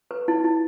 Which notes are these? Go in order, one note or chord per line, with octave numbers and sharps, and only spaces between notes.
B4
E4
E4